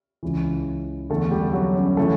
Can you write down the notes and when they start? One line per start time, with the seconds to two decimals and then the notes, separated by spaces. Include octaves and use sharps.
0.23 C#2 C#3 E3
1.10 E2 D3 A3 A4
1.31 G3 G4
1.53 F#3 F#4
1.76 C#4
1.97 C#3 E3 A3 A4